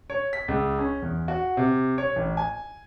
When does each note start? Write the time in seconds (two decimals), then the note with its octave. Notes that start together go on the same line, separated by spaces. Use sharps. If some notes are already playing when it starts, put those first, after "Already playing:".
0.10 C#5
0.33 B6
0.48 C#2
0.79 C#4
1.02 E2
1.28 F#4
1.57 C3
1.98 C#5
2.16 A1
2.37 G#5